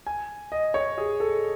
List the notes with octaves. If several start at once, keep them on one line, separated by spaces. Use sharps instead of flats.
G#5
D#5
C#5
G#4
A4